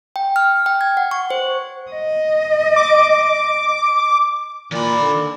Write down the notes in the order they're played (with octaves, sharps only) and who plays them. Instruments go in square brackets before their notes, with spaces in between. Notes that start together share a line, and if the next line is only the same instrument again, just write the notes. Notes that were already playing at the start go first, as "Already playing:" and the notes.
[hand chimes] G5
F6
G5
G#6
F#5
C#6
C5
[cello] D#5
[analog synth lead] D6
[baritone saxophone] A#2 [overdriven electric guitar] D#3 B5 [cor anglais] D5
[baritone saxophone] D3